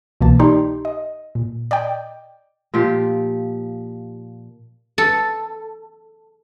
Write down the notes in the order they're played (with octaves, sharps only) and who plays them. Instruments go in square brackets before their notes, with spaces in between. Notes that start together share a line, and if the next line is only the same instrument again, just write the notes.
[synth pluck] C2 B2 E3 A#3 A5
D#4 G4 D5 G5 C6
D#5
A#2
D5 D#5 G5
[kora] A#2 F3 G4
[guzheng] A4